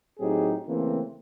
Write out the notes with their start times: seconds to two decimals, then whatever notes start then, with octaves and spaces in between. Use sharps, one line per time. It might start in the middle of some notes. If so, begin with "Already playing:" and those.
0.19 A2 F#3 C4 D#4 G4 G#4
0.67 C#3 E3 A3 A#3 C4